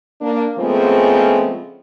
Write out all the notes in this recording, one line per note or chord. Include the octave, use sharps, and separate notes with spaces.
A#3 D4
C#3 F3 G#3 A3 B3 C4